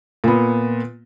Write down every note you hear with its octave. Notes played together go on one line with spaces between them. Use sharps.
A#2 B3